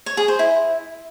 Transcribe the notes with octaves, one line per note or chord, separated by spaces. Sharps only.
C#5
G#4
C5
E4